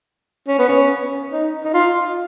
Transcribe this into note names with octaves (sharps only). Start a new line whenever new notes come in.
C#4
B3
C#4
D#4
D#4
F4